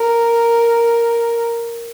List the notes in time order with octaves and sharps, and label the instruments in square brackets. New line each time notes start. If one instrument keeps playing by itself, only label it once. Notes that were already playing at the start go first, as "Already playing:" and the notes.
Already playing: [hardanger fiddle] A#4